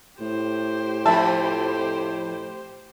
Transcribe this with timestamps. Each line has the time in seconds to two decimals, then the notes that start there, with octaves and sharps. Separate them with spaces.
0.20 A2 G4 C5
1.06 F2 E5 A5